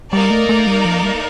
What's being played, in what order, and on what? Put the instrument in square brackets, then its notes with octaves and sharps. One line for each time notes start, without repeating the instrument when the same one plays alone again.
[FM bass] G3 [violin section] A#3 D#4 A#4 D5
[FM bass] A3
A3
G3
F3
G3